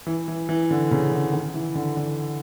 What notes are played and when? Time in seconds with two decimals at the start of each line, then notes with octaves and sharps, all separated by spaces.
0.07 E3
0.28 E3
0.49 E3
0.71 D3
0.91 C#3
1.12 D3
1.33 D#3
1.54 E3
1.75 D3
1.97 D3